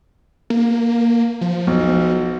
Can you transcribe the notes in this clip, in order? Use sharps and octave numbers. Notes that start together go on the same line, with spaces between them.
A#3
F3
B1